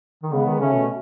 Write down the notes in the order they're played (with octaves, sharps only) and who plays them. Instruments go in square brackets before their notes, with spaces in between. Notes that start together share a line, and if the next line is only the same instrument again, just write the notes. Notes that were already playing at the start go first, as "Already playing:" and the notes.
[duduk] D#3
[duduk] C#3 [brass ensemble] G#3 B3
[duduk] D#3
[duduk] C#3 [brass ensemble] A3 C#4
[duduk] B2